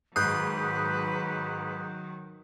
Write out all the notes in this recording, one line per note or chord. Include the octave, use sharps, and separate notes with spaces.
G#2 D#3 F#3 B4 D#6 F#6 G6 C7